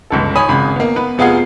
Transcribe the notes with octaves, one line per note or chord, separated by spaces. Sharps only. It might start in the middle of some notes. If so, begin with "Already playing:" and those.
G1 C#2 A4
C#5 G#5 B5 D#6
G#1 C#3 B5
A#3 B3
B3 B4
F1 B3 F4 G#4 F#5 C7